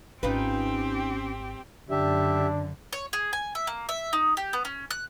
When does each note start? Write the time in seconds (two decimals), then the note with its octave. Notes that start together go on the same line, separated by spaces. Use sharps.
0.23 G#1 C4 C#4 D#4 F4 G4 B4
1.90 F#2 D3 D4 G4 E5
2.93 C#5
3.13 G#4
3.33 G#5
3.55 E5
3.67 A#3
3.89 E5
4.13 D#4
4.37 G4
4.53 B3
4.65 C#4
4.91 F#6